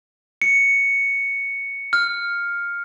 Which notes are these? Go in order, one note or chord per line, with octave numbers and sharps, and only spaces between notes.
C#7
F6